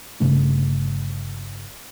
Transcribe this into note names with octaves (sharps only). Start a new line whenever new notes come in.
G1 C#3 A3 D4